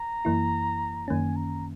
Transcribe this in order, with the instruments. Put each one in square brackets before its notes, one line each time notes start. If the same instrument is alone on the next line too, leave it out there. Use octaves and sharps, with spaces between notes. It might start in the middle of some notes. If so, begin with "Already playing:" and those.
Already playing: [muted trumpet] A#5
[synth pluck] F#2 E3 A#3 E4
[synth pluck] F#2 D#3 A#3 C#4 [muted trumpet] G#5
[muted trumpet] A#5